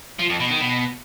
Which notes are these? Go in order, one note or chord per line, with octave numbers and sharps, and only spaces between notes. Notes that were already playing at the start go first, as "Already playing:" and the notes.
F3
F2
B2
D#3
B2